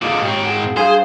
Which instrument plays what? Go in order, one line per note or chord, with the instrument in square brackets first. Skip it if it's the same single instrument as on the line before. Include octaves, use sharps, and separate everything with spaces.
[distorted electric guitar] A#2 D3 [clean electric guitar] F4 G#4 D#5
[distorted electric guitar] G#2 C4 [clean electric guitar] G4 C#5
[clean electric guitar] F#4 G#4
[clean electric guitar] G2 F5 [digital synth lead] G#4 [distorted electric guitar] C5